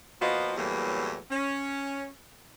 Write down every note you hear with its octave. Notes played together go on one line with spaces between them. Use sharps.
A#2 F3 B3 F4 F#4 D#5
E2 A2 E3 F#3 G3 A#3
C#4